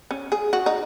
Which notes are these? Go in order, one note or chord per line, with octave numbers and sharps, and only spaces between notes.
C#4
G#4
F#4
D#4